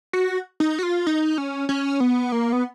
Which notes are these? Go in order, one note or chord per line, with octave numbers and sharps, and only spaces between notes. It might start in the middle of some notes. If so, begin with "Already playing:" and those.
F#4
D#4
F#4
F4
D#4
C#4
C#4
B3
A#3
B3